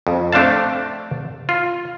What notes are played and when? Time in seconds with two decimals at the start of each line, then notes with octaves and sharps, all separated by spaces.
0.07 F2
0.33 A3 C4 D4 C5 F5 A5
1.49 F4